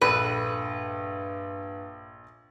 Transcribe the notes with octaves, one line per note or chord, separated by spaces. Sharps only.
A#1 G2 A4 B4 D#7